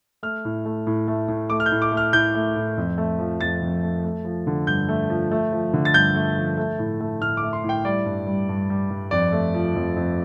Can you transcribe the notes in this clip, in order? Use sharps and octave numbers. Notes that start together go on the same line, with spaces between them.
A3 F6
A2
A3
A2
A3
A2
A3 D6
F6
G6
A2
D6
A3
F6
A2 G6
A3
A2
F2
A3
F3
F2 A6
F2
A3
A3
F3
D3
G2 G6
A3
F3
A3
F3
D3
A6
G2 G6
A3
F3
A3
A2
A3
A2 F6
D6
A3
C6
A2 G5
G3 D5
G2
G3
G2
G3
G2
F2 D5
A3
F3
F2
F2